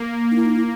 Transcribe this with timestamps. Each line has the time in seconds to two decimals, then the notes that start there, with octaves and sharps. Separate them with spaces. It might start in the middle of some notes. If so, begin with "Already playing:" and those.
Already playing: A#3
0.31 D#4
0.36 E4
0.46 D#4
0.56 E4